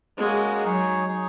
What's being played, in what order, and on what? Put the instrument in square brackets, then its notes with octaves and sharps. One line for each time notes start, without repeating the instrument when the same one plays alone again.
[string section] G#3 [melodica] A#3 C#4 F#4
[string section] F#3 [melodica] D#4 G#4 C#5
[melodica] D#4 G#4 C#5